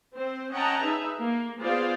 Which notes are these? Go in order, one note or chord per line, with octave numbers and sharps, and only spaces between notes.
C4 C5
C#4 D#5 F#5 G5 A5 A#5
D#4 G#4 B4 E5
A#3
B3 F4 G#4 C5 D5 F5